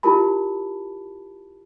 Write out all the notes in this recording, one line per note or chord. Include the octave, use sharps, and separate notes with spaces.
E4 F4 G4 A#4 A5 B5